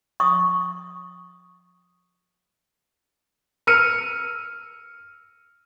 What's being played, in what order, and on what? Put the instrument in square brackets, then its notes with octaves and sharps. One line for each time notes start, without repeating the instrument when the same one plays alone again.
[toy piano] C#6 D#6
[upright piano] E6 F6 C#7 D#7